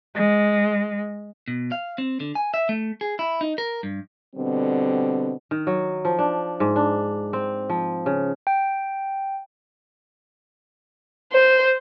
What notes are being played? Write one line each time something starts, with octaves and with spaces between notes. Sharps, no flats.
G#3
B2
F5
C4
D3
G#5
E5
A3
G#4
E4
D#4
A#4
G2
B2 D3 G3 C4
D#3
F#3
F3
D4
G#2
D4
C4
F3
C#3
G5
C5